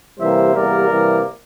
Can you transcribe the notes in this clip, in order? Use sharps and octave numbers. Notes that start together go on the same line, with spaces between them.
C3 E3 G3 A#3 C5 E5
E2 C3 G3 A#3 A#4 D5
C3 E3 G3 A#3